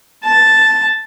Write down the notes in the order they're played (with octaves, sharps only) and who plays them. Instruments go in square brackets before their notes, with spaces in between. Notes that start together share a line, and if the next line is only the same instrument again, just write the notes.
[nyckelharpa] A5